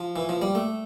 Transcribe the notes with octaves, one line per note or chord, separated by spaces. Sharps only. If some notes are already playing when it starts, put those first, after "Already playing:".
Already playing: F3
E3
F3
G3
A3